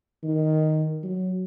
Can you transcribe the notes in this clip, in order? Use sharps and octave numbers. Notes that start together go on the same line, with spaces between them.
D#3
F#3